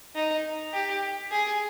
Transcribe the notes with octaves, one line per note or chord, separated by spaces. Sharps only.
D#4
G4
G#4